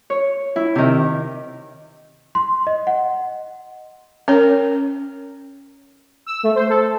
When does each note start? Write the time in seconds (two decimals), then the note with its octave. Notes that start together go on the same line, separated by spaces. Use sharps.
0.10 C#5
0.56 E4
0.75 C3 D#3
2.35 C6
2.67 D#5
2.87 F#5
4.28 C#4 A#4 C#5
6.26 E6
6.43 A3
6.55 C5
6.69 A4